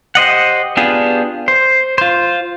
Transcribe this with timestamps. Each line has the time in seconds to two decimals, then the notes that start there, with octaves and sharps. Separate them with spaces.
0.15 G4 C5 D#5 F#5
0.77 B3 D4 F4 G4 G#4
1.48 C5
1.98 F4 C5